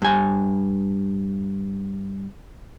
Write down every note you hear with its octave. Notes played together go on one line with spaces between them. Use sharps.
G2 G#5